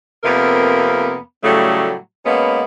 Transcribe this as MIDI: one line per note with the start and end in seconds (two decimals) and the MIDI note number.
0.24 1.17 41
0.24 1.17 48
0.24 1.17 58
0.24 1.17 59
0.24 1.17 70
1.44 1.96 45
1.44 1.96 49
1.44 1.96 54
1.44 1.96 55
1.44 1.96 57
2.26 2.63 47
2.26 2.63 56
2.26 2.63 58
2.26 2.63 59
2.26 2.63 61